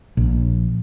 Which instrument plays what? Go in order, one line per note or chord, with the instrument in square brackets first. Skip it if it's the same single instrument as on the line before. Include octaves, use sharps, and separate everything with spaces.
[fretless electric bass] A#1